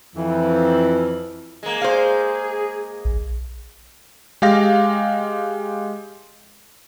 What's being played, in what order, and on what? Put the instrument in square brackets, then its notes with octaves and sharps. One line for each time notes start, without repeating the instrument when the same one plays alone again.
[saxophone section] F2 E3
[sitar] G#3 A#3
[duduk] G#4 [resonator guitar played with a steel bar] C5 F5
[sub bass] A#1
[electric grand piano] G#3 G4 F5 A#6